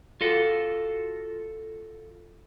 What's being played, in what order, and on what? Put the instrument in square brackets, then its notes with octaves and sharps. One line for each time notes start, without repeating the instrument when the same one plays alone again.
[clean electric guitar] F4 F#4 A4